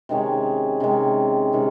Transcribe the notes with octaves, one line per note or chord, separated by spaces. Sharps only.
C3 D#3 G#3 C#4
C3 D#3 G#3 C#4
C3 D#3 G#3 C#4